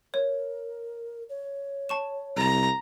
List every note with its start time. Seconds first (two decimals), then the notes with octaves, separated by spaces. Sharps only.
0.14 A#4 C#5
1.29 C#5
1.89 A5 C#6 E7
2.37 C2 A#5